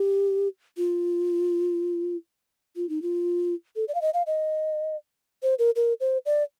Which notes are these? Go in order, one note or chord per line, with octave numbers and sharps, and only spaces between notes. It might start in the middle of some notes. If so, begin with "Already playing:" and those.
Already playing: G4
F4
F4
D#4
F4
A4
D5
F5
D#5
F5
D#5
C5
A#4
A#4
C5
D5